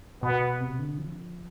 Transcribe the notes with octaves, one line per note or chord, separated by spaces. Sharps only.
B2 B3
C3
D3
F3